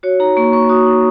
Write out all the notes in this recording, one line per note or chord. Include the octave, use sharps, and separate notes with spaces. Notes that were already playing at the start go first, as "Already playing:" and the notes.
F#4 C#5
D#4 A#5
A#3 C#6
A#3 C#6
F#4 D#6
D#4